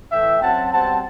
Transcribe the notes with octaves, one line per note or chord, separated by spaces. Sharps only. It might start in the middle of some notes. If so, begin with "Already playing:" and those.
A2 E3 A3 E5 G5
F#2 F#3 C4 F#5 A5
B2 G3 C4 F#5 A5